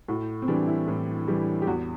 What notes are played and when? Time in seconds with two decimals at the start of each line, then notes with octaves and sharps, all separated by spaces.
0.08 A2 F#4
0.42 C4
0.48 E3 G3 D4
0.67 E4
0.88 A2
1.28 E3 G3
1.62 G4
1.67 E2 F#4